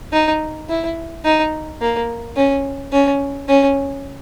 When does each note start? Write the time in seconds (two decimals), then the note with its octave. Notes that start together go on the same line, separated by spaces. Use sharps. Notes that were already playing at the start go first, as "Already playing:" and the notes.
0.13 D#4
0.69 E4
1.24 D#4
1.81 A#3
2.36 C#4
2.92 C#4
3.48 C#4